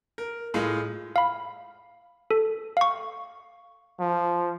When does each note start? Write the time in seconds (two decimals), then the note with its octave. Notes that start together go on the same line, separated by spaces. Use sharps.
0.18 A#4
0.54 A2 G#3 F4
1.16 F5 B5
2.31 A4
2.77 F5 C#6
4.00 F3